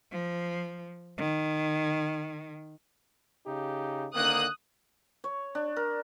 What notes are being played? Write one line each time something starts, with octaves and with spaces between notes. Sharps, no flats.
F3
D#3
C#3 D#4 G4
D3 D#3 A#3 D#6 F#6
C#5
D4
A#4